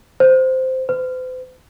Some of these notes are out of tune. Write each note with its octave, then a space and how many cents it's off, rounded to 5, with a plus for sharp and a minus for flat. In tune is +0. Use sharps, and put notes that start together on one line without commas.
C5 -10
C5 -45